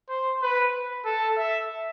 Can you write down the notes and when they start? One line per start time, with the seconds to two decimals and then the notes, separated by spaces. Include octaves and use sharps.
0.09 C5
0.42 B4
1.05 A4
1.38 E5